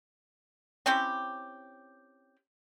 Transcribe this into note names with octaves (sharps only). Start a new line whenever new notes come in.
C4 C#4 E4 G4